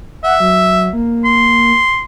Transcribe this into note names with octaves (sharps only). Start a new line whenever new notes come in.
E5 F#5
F#3
A#3
C6